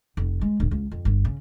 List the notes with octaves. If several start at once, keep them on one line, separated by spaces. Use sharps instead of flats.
F1
G#3
D1
C#2
F2
G1
C#3